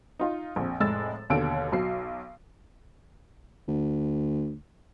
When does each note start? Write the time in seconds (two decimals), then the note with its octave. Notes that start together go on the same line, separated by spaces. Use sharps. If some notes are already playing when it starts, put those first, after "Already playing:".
0.19 D#4 F4
0.56 A#1 F2
0.80 F1 A2 G#3 E6 A6
1.30 D#2 B2 D3 C#5 E6 D7
1.72 B1 F#3 C7
3.68 D2